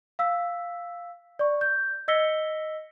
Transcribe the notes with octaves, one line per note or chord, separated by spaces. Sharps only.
F5 E6 B6
D5 C#6
G6
D#5 E6 A#6 B6 C#7 G7